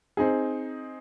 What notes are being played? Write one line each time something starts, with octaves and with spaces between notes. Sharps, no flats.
C4 D#4 G#4